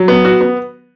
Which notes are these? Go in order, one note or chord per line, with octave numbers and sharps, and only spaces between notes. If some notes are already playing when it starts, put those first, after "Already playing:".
Already playing: F#3
B3
F#4
B3